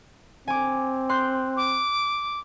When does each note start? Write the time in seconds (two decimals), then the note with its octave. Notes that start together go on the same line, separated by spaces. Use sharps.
0.48 C4 G#5 D6
1.09 C6 F#6 G6
1.57 D6